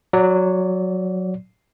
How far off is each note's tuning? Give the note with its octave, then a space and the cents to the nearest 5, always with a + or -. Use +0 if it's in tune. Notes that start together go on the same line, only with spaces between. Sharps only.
F#3 -5 D5 -25